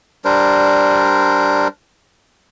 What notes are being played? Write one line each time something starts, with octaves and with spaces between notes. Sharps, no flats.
G3 D4 A#4 C5